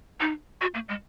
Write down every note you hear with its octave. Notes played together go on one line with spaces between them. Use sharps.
D#4
F#4
A#3
G#3